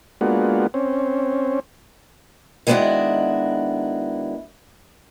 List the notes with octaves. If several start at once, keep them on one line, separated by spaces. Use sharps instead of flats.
G#3 A#3 B3 D4 F4 F#4
C4 C#4
D#3 G#3 B3 D4 E4 F#4